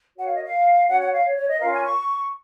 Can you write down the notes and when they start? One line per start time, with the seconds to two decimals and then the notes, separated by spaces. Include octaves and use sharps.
0.17 F#4 A#4 C#5 F#5
0.26 F5
0.35 D#5
0.44 F5
0.89 C#4 F#4 C#5 F#5
1.01 F#5
1.13 F5
1.25 C#5
1.37 C#5
1.48 D#5
1.60 C#4 F4 A#4 F5
1.73 G#5
1.85 C#6